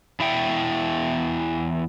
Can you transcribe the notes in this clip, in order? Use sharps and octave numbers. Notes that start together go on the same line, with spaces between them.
E2 E4 E5 G5